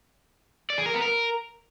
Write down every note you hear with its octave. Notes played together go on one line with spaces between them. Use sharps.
D5
G#4
A#4
B3
A#4